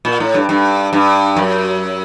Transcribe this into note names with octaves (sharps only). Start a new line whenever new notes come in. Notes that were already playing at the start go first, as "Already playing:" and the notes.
A#2
A2
G2
G2
G2
F#2